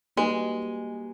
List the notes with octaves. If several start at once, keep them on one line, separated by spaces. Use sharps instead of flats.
G3 G#3 A#3 D#4 F#4 B4